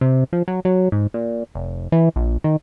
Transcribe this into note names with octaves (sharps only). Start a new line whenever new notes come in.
C3
F3
F#3
F#3
G#2
A#2
F1
E3
A#1
D#3